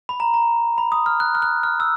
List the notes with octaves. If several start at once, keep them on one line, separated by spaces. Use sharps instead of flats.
B5
A#5
A#5
B5
D#6
F6
F#6
F6
F#6
F6
E6